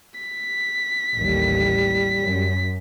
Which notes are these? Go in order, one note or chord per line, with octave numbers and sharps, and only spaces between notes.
B6
A1 D#2 G3
F#2